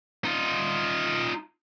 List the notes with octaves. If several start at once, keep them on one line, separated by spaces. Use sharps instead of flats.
D#4 F4